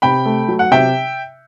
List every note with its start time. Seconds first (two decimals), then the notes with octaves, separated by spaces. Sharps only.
0.02 C3 G5 B5
0.26 A3
0.48 F#3
0.59 F#5
0.71 C3 E5 G5